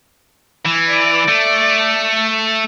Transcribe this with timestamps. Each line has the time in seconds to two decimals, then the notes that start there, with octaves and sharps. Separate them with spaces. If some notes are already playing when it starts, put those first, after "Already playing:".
0.66 E3
0.89 D5
1.28 A3